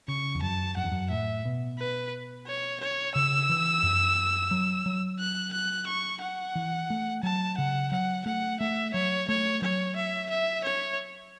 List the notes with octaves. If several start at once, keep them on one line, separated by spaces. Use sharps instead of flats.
C#3 C#6
E2
F#2 A5
F#2 F#5
E2
F#2
A2 E5
B2
B4
C#5
C#5
C#3 E6
E3
F#2
F#3
F#3
F#6
F#6
C#6
F#5
E3
A3
F#3 A5
C#3 F#5
F#3 F#5
A3 F#5
A3 E5
F#3 C#5
A3 C#5
F#3 C#5
E5
E5
C#5